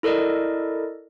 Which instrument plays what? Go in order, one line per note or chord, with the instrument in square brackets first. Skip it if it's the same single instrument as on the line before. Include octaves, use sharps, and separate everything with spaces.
[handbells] E4 A4 A#4 D5 D#5